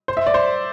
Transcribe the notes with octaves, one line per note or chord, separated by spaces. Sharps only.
C5
E5
D5
C5